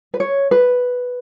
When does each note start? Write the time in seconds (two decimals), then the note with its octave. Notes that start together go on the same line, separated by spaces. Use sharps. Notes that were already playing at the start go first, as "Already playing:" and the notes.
0.14 B4
0.20 C#5
0.51 B4